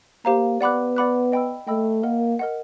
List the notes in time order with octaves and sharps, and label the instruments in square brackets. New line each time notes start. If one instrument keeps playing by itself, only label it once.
[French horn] A#3 [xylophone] G4 C5 F5 A#5
[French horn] B3 [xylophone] D5 F#5 B5 D6 F#6
[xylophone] D5 F#5 B5 D6 F#6
D#5 G5 B5 E6
[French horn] A3 [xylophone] D#5 G5 B5 E6
[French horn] A#3 [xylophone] A#4 D#5 F#5
[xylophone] A#4 D#5 F#5